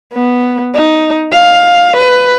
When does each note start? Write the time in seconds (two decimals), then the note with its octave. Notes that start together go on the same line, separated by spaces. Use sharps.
0.13 B3
0.74 D#4
1.32 F5
1.97 B4